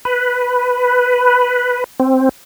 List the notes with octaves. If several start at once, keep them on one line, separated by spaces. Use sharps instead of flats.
B4
C4